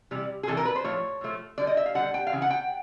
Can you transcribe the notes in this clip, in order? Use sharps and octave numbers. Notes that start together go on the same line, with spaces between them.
C3 E3 G3
G#4
C3 E3 G3 A4
A#4
B4
C5
A2 F3 A3 C#5
A2 F3 A3
D3 G3 D5
D#5
E5
F5
D3 G3 F#5
G5
F5
C#3 E3
F#5
G5